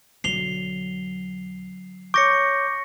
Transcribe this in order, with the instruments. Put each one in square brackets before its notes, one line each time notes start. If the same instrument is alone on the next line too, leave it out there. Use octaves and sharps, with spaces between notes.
[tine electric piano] B1 [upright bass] D3 F#3 [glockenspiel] C7 F7 G7
[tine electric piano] C#5 G6 [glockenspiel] C#6 A#6 C#7 [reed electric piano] D6